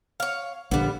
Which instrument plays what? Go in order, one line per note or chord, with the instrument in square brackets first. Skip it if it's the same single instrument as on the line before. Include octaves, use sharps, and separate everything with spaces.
[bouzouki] C#5 F5
[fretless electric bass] A#1 D3 [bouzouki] G3 B3